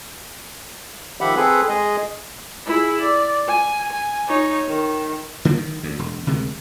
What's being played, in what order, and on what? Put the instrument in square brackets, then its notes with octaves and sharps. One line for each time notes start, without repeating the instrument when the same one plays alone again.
[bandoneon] D#3 F3 G4 E5 F#5 B5
C4 G#4 A4 B4
G#3 G#4 D#5
[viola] E4 G#4
D5
G#5
G#5
D#4 C#5
D#3
[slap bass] D3 G3 A#3
D#3
D2
E1
D2 C3 D#3 G#3